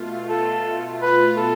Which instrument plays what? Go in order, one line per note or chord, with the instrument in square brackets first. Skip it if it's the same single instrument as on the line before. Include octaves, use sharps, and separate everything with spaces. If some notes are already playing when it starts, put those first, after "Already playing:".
Already playing: [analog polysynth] B2 A3 F4
[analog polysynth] B2 A3 F4 [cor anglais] A4
[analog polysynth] B2 A3 F4 [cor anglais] B4
[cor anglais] A4